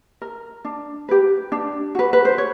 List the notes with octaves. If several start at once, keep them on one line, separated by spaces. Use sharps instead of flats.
A#4
D4
G4 B4
D4
F#4 B4
B4
C5
C#5